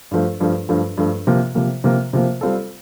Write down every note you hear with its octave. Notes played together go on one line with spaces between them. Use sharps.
G2 F3 A3
G2 F3 A3
G2 F3 A3
G2 F3 A3
C3 F3 A#3
C3 F3 A#3
C3 F3 A#3
C3 F3 A#3
G3 C4 F4 A4